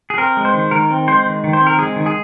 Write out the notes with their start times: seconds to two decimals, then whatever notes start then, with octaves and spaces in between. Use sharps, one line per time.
0.10 G#4
0.18 C4 A#4
0.37 G#3
0.45 C5
0.54 D#3
0.71 D#3 A#4
0.90 C4
1.08 G#3 C5
1.26 D#3
1.44 D#3
1.53 C5
1.61 C4
1.67 A#4
1.79 G#3 G#4
1.96 D#3
2.06 G#4